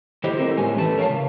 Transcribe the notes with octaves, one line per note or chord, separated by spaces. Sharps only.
D3 E4 G4 C5 D#5
A3 C4 E4 A#4 C5
A2 G#3 C#4 G4 G#5
E2 E3 A3 B4 A5
A#4 C#5 D5 F5 A5
C#3